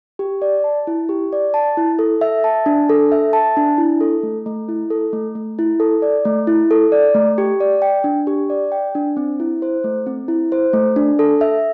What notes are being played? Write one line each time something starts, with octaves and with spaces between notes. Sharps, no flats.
G4
D5
A5
E4
G4
D5
A5
E4
A4
E5
A5
D4
A4
E5
A5
D4
E4
A4
A3
A3
E4
A4
A3
A3
E4
A4
D5
A3
E4
A4
D5
A3
G4
D5
G5
D4
G4
D5
G5
D4
C4
E4
C5
A3
C4
E4
C5
A3
D4
A4
E5